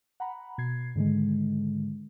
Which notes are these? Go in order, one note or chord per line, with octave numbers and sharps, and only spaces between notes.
F#5 A#5 B5
B2 G#6 C7
G#2 D3 D#3 G#3